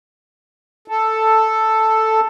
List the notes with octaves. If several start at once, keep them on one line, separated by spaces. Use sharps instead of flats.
A4